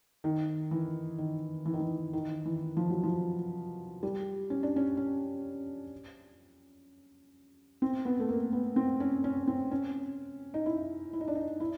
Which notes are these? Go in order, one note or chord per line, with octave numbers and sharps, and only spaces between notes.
D#3
E3
D#3
E3
D#3
E3
D#3
E3
F3
F#3
F3
G3
C#4
D4
C#4
C#4
C4
B3
A3
A#3
B3
C4
C#4
C#4
C4
C#4
D#4
E4
E4
D#4
D4
D#4
E4